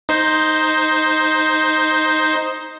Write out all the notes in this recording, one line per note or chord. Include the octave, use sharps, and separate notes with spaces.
D#4 C5